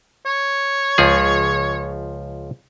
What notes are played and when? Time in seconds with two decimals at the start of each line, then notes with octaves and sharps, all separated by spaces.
0.26 C#5
0.98 C#2 F3 G#4